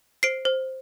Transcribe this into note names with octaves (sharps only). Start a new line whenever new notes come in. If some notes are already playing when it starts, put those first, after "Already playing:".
C5 C7 D7
C5